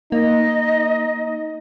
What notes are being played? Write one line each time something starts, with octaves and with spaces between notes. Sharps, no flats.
A#3 D#4 D#5